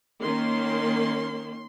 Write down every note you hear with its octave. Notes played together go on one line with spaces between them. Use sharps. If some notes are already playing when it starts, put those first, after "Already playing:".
D#3 A#3 C#4 C6